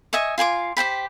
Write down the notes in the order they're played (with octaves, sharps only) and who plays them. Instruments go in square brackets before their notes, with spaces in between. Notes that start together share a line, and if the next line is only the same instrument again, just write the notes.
[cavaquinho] D#5 E5 G#5 C#6
F4 G#5 C6 D6
G4 C5 G5 B5